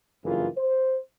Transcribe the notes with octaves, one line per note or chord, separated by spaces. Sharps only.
F#1 G2 E3 F4 G#4 A#4
C5